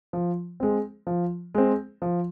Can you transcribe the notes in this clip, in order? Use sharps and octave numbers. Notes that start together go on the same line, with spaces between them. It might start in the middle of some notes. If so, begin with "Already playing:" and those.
F3
G#3 C4
F3
G#3 C4
F3